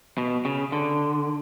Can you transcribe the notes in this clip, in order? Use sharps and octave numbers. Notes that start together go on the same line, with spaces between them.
B2
C#3
D3